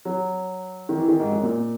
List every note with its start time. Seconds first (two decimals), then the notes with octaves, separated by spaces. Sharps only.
0.05 F#3
0.89 D#3
0.97 E3
1.08 D#3
1.20 G#2
1.31 F#2
1.43 A#2